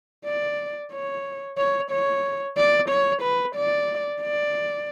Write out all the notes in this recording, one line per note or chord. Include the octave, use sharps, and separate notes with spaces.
D5
C#5
C#5
C#5
D5
C#5
B4
D5
D5